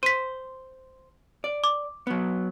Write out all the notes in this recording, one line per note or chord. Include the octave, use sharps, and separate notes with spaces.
C5 B6 D#7
D5
D6
F#3 B3